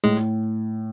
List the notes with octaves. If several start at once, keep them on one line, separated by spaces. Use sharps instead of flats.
A2 G#3